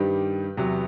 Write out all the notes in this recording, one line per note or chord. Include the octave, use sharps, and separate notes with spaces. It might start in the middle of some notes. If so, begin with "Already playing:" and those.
Already playing: G2 D#3 G3 G4 B4
E2 C3 F#3